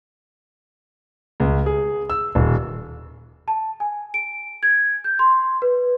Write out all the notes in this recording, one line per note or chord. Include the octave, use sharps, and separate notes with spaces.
C#2
G#4
E6
D#1
A5
G#5
D7
G#6
G6
C6
B4